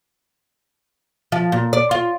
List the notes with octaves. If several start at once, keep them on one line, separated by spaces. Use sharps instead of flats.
F3
A#2
D5
F4